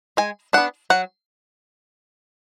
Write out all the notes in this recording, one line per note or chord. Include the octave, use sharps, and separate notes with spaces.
G#3 G#5
B3 D4 F#5
F#3 F#5